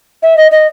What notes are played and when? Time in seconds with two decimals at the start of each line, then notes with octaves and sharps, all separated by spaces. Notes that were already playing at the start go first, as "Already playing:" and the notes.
0.22 E5
0.36 D#5
0.51 D#5